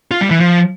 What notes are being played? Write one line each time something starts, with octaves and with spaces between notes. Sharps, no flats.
F4
G3
E3
F3